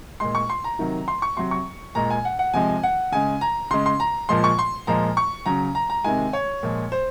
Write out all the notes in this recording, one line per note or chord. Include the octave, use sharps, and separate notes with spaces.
A#2 G#3 C6
C#6
C6
A#5
C3 D#3 F#3
C6
C#6
C3 F#3 C6
C#6
A#2 G#3 A#5
G#5
F#5
F#5
C3 F3 G#3 G#5
F#5
C#3 G#3 G#5
A#5
C#3 G#3 C6
C6
A#5
A#2 F3 G#3 C6
C#6
C6
A#2 F3 G#3 A#5
C#6
C#3 F#3 A#5
A#5
A#5
C3 D#3 G#3 G#5
C#5
A#2 F3 G#3
C5